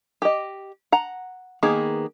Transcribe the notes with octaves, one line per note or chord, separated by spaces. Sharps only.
G4 D#5
F#5 A#5
D#3 A#3 B3 G#4